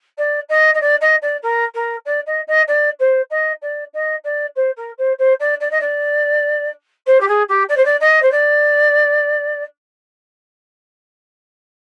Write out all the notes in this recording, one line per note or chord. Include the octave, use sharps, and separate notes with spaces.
D5
D#5
D#5
D5
D#5
D5
A#4
A#4
D5
D#5
D#5
D5
C5
D#5
D5
D#5
D5
C5
A#4
C5
C5
D5
D5
D#5
D5
C5
G4
G#4
G4
D5
C5
D5
D#5
C5
D5